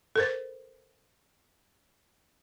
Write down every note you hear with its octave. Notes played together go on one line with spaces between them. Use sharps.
A4 A#4 C5